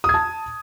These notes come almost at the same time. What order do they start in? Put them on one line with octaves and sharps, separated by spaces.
D#6 G#6 A5